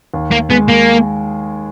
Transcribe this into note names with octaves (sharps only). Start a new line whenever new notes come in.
D#2
A#3
G#3 B3
A#3